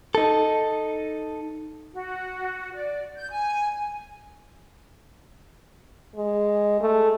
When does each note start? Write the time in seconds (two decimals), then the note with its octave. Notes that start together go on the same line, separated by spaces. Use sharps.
0.15 D#4 A4
1.93 F#4
2.74 D5
3.16 G6
3.31 G#5
6.15 G#3
6.81 A3